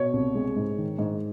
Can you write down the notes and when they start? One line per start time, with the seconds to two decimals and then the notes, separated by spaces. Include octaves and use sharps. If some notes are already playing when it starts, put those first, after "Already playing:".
Already playing: B2 C#5
0.13 C2
0.35 G#3
0.56 G#2
0.78 D#3
0.98 G#2